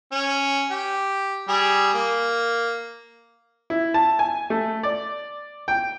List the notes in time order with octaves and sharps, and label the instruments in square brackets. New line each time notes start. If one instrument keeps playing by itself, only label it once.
[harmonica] C#4
G4
G3 G#4
A#3
[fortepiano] E4
A5
G#5
A3
D5
G5